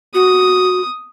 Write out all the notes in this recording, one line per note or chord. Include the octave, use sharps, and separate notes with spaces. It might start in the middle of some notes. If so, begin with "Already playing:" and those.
F#4 D#6